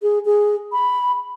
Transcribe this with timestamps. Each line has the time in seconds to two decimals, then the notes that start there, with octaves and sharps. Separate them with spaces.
0.02 G#4
0.25 G#4
0.72 B5